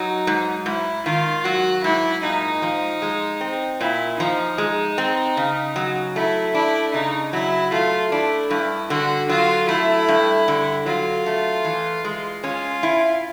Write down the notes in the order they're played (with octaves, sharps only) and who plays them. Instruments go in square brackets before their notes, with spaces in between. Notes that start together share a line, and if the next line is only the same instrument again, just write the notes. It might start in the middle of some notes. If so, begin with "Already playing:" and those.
Already playing: [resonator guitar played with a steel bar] F#3 [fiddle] D#4
[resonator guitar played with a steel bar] G#2
[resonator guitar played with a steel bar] G#2 [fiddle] E4
[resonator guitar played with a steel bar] D#3 [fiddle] F4
[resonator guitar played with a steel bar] F#3 [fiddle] F#4
[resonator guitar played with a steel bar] G#2 [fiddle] E4
[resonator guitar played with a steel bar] A#2 [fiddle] D#4
[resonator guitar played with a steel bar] F3
G#3
C4
[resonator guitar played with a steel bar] A#2 [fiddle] E4
[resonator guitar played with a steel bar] F3 [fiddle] D#4
[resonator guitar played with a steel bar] G#3
C4
C#3
F#3
[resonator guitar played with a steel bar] A3 [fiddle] E4
[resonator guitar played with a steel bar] D4 [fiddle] E4
[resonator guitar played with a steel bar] C#3 [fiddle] D#4
[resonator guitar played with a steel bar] F#3 [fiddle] E4
[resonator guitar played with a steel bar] A3 [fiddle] F4
[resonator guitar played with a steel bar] D4 [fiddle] E4
[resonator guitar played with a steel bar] G2 [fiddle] E4
[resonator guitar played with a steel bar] D3 [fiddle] F#4
[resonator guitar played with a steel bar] F#3 [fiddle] F4
[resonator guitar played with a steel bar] A3 [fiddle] E4
[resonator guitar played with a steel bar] G2
D3
[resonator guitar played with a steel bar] F#3 [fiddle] F4
[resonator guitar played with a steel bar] A3
E3
G#3
[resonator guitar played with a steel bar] C#4 [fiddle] F4
[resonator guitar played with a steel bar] E4